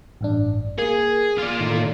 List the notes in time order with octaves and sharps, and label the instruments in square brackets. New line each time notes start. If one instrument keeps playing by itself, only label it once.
[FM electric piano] A1 G2 D4
[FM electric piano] A#3 [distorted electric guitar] G#4
[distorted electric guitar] F4 D5 [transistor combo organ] F6
[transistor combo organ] A2 D#3